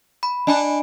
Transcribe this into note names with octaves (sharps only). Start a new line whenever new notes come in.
B5
D4 D#5 G#5 B5